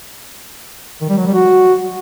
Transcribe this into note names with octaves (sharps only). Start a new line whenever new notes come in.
D#3
G3
F#3
G3
F#4